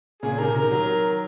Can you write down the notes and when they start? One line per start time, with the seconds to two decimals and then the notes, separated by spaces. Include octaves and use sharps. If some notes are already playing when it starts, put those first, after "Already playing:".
0.23 A#2 C#3 G#4
0.38 C3 D#3 A#4
0.55 C3 D#3 A#4
0.71 D#3 F#3